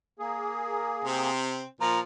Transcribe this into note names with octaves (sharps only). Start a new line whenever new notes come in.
A#3 G#4
C3 C4
A#2 F3 A#5